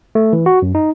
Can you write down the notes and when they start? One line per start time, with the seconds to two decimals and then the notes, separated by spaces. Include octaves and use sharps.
0.15 A3
0.33 E3
0.46 F#4
0.62 F#2
0.75 D#4